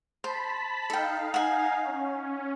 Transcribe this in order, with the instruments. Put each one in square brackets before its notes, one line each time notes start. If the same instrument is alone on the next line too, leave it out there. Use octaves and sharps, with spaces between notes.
[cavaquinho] C5 [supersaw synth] A5 B5 B6
[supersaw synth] D#4 F5 [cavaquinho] A4 G5
[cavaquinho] F#5 G#5
[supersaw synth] C#4